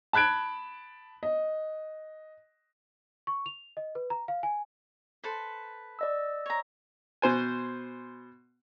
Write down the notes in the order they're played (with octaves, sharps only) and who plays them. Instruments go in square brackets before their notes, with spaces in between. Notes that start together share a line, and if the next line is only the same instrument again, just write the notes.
[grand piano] A5 B5 F#6 G#6 D7
D#5
[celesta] C#6
F7
D#5
B4
A#5
F5
G#5
[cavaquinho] A4 B4 C5
[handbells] D5 D#5 E6
[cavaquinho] C#5 A#5
[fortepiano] B2 C5 G#5